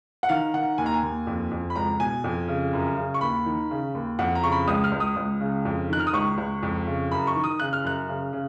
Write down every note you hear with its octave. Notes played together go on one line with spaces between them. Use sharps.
F#5
D#3 F5
D#3 F#5
D#2 G#5
A#5
G#5
D#2
F2
F2
B5
C#2 A#5
B2 G#5
F2
C#3
F#2
C#3
C#6
D#2 B5
D#3
C#3
D#2
F2 F#5
A#5
C#3 C#6
B5
C#2 D#6
F6
C#2
D#6
C#2
C#3
F2
D#3 F#6
F6
D#6
C#2 C#6
C#2
F2
C#3
F#2 B5
C#6
D#3
D#6
C#3 F#6
F6
F#2 F#6
C#3
C#3